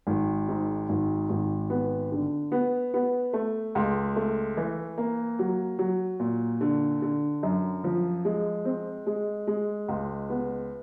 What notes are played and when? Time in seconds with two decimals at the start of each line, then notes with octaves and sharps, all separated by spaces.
0.07 G#1
0.48 G#2
0.89 G#1
1.29 G#1
1.70 B3
2.12 D3
2.52 B3
2.94 B3
3.33 A3
3.75 C#2
4.16 A3
4.57 E3
4.98 A#3
5.39 F#3
5.79 F#3
6.20 A#2
6.61 D3
7.02 D3
7.43 F#2
7.84 F3
8.25 G#3
8.65 C4
9.06 G#3
9.47 G#3
9.88 C#2
10.30 B3